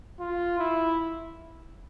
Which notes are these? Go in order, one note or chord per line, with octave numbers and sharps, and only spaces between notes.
F4
E4